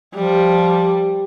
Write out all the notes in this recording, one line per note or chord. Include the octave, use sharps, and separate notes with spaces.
F3 G3